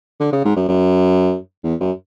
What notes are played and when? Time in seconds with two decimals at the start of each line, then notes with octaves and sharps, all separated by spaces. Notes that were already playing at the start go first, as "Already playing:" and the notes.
0.20 D3
0.33 C#3
0.45 G#2
0.56 F#2
0.69 F#2
1.64 E2
1.80 F#2